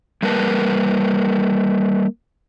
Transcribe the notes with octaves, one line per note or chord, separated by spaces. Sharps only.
G3 A#3 A#4 B4 A5